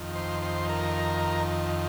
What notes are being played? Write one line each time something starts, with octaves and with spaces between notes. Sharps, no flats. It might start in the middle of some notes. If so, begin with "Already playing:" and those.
Already playing: F2 D#3
C5
C5
A#4